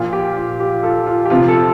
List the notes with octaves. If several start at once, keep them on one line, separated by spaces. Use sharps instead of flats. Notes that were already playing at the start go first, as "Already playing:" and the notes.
Already playing: A#2 F3 F4
G4
F4
G4
F4 A4
F4
G4
C3 F3 F4
F4 A4